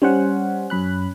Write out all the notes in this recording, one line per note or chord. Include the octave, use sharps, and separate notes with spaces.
G3 C#4 C5 F#5
F#2 B5 F#6